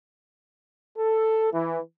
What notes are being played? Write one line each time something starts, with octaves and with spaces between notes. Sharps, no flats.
A4
E3